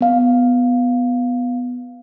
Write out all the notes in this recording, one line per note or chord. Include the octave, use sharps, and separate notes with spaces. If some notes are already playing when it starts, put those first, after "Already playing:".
B3 F5